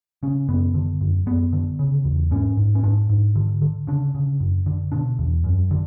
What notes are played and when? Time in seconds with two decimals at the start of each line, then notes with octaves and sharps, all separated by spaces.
0.23 C#3 C#4
0.48 F#2 B3
0.74 D3
1.01 F#2
1.26 F#2 B3
1.53 D3
1.79 C#3
2.05 E2
2.31 G#2 C#4
2.57 G#2
2.75 C#4
2.83 G#2 D4
3.09 G#2
3.35 D3
3.62 D3
3.87 C#3 D4
4.15 C#3
4.40 F#2
4.66 D3
4.92 B2 D4
5.19 E2
5.44 F#2
5.71 D3